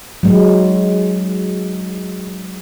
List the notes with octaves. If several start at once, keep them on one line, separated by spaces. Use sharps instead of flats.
F#3 G#3